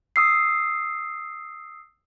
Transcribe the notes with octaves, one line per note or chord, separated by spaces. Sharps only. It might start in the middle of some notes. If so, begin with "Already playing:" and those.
D#6 E6 C7